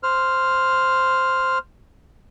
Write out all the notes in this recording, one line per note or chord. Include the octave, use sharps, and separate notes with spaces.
C5 F6